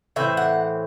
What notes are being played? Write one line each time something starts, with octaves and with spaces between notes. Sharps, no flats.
A2 E3 C4 E5
F#5